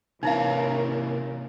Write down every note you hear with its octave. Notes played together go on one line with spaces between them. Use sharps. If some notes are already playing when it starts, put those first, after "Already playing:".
C3 E3 A#3 C#4 D#4 E4 A#4 F5